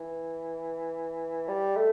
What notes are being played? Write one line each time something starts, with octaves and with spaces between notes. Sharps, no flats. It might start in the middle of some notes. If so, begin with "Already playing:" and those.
Already playing: E3
G3
A3